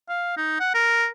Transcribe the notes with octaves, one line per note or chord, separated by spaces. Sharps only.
F5
D#4
F#5
A#4